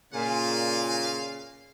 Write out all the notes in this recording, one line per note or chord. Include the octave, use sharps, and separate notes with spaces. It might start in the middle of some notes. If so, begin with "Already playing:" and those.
A#2 C#3 F5 G#5